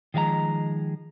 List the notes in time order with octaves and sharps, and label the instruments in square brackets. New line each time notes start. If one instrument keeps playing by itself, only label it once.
[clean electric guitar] D#3 F3 G#3 F5 A#5